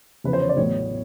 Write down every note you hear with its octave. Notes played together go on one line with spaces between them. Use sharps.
E2 C#3 F3 B4
C5
C#5
D5
A1 A2 F#3 B3 C#5